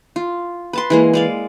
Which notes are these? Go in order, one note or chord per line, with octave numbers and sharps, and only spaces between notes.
F4
B4 A5 C6
E3 G#3 A#3
G#3 D5 F5